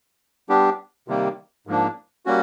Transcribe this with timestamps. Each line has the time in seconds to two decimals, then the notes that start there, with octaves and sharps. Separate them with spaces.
0.49 G3 B3 D4 G4
1.08 C3 D#3 G3 A#3
1.67 G#2 F3 A#3 D4
2.26 G3 A#3 C#4 F#4